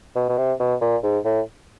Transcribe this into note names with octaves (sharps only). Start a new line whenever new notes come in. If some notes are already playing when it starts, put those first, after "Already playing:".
B2
B2
C3
B2
A#2
G#2
A2